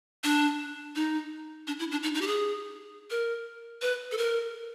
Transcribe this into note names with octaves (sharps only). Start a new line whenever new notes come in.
D4
D#4
D4
E4
D4
D#4
D#4
G4
G#4
A#4
B4
A4
A#4